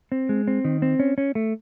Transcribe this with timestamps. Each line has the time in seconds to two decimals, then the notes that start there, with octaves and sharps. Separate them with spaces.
0.12 C4
0.29 G#3
0.47 C4
0.65 D#3
0.82 C4
1.00 C#4
1.18 C#4
1.35 A3